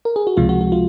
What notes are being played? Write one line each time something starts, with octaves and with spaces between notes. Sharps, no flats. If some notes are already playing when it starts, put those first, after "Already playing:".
A#4
G#4
F#4
C#2 C3 F3 G#3 F4
F#4
F#4
F4